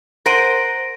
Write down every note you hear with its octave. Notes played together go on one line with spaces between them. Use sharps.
A#4 C5 F#5 A#6 D7 D#7